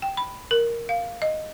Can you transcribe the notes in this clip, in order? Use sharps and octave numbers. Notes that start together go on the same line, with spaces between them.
G5
B5
A#4
F5
D#5